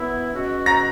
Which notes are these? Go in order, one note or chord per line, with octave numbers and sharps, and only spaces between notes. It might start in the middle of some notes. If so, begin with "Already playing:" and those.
Already playing: F#2 E3 B3 E4
B2 G#3 C#4 F#4
A#5 A#6